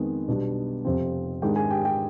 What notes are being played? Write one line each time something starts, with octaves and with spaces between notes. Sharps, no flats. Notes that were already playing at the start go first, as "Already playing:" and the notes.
Already playing: F2 D#3 G#3 B3
B1 B2 G3 B3 D4
F1 F2 C3 F3 C4
G#2 D#3 G#3 D4 G4 G5
G#4 G#5
G4 G5
G4 G5